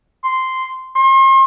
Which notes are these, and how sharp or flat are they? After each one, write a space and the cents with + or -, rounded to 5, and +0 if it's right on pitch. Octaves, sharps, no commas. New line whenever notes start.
C6 -5
C6 +40